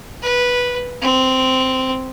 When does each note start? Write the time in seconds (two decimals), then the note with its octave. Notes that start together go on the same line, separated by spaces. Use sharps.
0.22 B4
1.02 C4